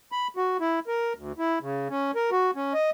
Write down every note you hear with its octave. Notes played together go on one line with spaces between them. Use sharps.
B5
F#4
E4
A#4
D2
E4
C#3
C#4
A#4
F#4
C#4
D#5